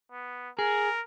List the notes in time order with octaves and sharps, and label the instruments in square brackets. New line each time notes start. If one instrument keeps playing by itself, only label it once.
[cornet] B3
[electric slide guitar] G#4 [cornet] A#4